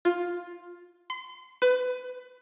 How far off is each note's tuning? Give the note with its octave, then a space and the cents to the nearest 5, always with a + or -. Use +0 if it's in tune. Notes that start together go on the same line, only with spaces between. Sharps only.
F4 +10
C6 -35
B4 +25